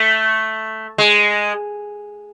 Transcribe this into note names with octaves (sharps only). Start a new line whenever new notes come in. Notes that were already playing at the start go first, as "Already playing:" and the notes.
Already playing: A3
G#3